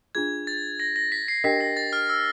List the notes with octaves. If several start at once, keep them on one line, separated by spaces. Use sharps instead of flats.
D4 F4 G#4 G#6
A6
A#6
A#6
B6
C7
D4 G4 A#4 D#5 G5 B6
A#6
A6
F6
E6